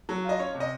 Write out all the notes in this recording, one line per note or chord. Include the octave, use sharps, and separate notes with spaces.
F#3
F4 D#5
C#4 C#5
C3
D#5